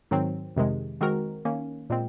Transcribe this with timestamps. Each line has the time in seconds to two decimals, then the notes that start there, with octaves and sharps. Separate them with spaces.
0.11 G#2 D#3 F#3 C4
0.56 F2 C3 D#3 G#3
1.01 D#3 G#3 C4 F#4 A#4
1.45 D#3 A#3 C#4
1.90 A#2 G#3 C4